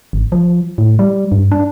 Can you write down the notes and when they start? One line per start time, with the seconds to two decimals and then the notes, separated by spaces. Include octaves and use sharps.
0.13 G#1
0.32 F3
0.78 A2
0.99 G3
1.32 G2
1.52 D4